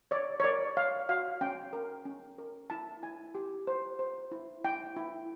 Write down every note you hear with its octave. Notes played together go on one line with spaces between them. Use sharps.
C#5 D5
C#5
A#4 D5
C#5 F5
F#4 F5
C#4 G5
A#4
C#4
A#4
E4 A5
E4 G#5
G4
C5
C5
E4
E4 G5
E4